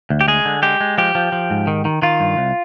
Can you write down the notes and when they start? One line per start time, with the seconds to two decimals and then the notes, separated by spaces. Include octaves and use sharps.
0.10 D2
0.21 G4
0.28 G#3 G#4
0.45 D3
0.63 G#3 G4
0.80 G#3
0.98 F3 G4
1.15 F3
1.32 F3
1.50 G#2
1.67 D#3
1.85 D#3
2.02 D#3 F4
2.20 G2
2.37 C2